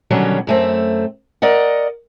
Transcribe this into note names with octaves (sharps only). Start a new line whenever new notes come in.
B2 D3 D#3 F#3 G3 C#4
F#2 A3 C4
A#4 D5 D#5 F#5